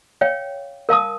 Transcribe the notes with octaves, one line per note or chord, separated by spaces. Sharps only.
C#5 F5 G5
A#4 F5 A5 D#6